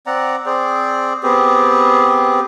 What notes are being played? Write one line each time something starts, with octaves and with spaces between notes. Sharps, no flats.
C4 D5 F#5 A#5
C4 G#4 C5 D5
B3 C4 G4 G#4